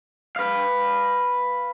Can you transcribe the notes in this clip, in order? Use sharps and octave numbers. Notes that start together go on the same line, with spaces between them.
B4 F5